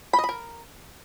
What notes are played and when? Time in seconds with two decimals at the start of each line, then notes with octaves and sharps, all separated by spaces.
0.13 B5
0.19 D#5
0.24 B5
0.29 A#4